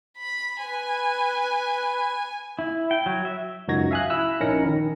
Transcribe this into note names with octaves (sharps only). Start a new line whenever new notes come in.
B5
B4 G#5
E4
G5
F#3
E5
C#2 F#2 D#4 F#4 G#6 A#6
E5 F5 G#5 D#6 F#6
E4 B5 E6 F#6
A#1 C#4 D#4 A#4 A#6 C#7
D#3